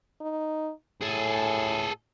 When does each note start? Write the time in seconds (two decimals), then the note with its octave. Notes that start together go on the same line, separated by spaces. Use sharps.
0.21 D#4
1.01 A2 G#4 A4